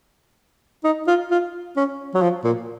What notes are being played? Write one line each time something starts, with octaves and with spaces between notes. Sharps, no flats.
D#4
F4
F4
C#4
F#3
F3
A#2